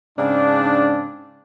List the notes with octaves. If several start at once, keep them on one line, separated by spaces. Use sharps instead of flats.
G#2 C#3 C4 D4